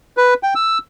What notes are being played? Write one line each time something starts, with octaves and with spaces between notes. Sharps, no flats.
B4
G5
E6